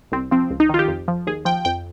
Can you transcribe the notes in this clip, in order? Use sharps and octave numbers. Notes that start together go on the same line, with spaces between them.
C2 C4
F3 C4
C#2
D#4
D#3 F4
G4
F2
F3
D#2 G#4
F3 G5
F2 G5